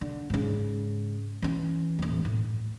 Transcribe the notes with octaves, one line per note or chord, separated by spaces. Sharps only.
D3
G#2 C#3
E3 C#4
D#1 A1
A2